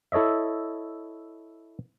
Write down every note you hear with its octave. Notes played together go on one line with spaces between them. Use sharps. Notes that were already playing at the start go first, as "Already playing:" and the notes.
E4 A4 C#5 D#5 E5